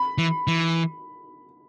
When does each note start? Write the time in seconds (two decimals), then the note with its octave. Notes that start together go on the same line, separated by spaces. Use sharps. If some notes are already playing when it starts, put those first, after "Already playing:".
Already playing: B5
0.18 E3
0.47 E3